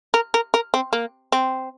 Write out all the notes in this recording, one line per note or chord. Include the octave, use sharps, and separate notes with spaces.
A#4
A#4
A#4
C4
A#3
C4